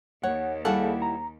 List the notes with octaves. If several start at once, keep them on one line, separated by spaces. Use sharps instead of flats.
D#2 C#5 F#5
G3 E4 G#4 A4 F5 F#5
A#5